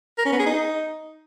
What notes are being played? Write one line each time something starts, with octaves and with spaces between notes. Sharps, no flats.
A#4
C#4
B3
G#4
D#4